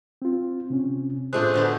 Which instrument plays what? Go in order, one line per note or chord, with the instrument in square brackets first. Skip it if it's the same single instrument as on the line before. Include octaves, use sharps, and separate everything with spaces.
[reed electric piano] C4 F4
C3 C4 C#4
[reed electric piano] A2 F4 F#6 [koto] G#3 A3 D4 [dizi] C5
[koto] B2 D3 B3